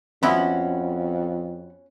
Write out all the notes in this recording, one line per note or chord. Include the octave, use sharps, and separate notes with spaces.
F2 B3 C#4 E4 F#4 B5 C6